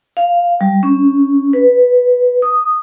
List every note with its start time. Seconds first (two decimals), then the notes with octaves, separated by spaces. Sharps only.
0.17 F5
0.61 G3
0.83 C#4
1.53 B4
2.42 D#6